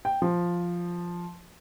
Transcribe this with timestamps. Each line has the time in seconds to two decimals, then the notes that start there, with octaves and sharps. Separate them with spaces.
0.05 G5
0.22 F3